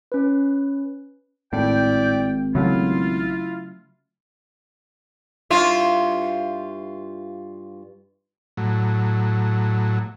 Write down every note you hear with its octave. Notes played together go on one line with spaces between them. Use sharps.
C#4 B4
G#1 A2 E4 D5 G5
C#3 F#3 A3 E4 F4
G2 F4 E5
A2 F#3